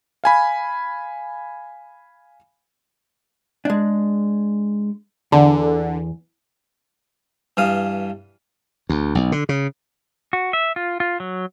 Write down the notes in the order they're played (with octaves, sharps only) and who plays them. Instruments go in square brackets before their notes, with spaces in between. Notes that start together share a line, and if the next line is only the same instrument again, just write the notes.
[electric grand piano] F5 G#5 B5
[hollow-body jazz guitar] G#3 D4
[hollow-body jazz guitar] E2 [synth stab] D3
[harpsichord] G2 E3 F5 D#6
[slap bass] D2
B1
D3
C#3
[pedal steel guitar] F#4
E5
F4
F4
F#3